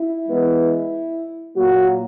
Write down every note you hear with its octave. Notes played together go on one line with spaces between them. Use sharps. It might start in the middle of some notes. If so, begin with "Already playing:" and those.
Already playing: E4
E3 G#3 B3
A#2 F#3 A#3 F#4